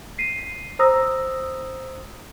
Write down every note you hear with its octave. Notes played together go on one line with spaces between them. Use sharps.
B6 C7 D#7
C5 A#5 D#6 E6 A#6